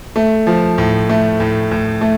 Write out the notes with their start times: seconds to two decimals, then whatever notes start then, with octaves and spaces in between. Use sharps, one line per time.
0.16 A3
0.47 F3
0.78 A2
1.09 A3
1.40 A2
1.71 A2
2.01 A3